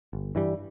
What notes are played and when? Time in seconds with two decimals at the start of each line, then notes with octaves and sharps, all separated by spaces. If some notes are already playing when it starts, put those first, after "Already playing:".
0.13 G1
0.35 G2 E3 G3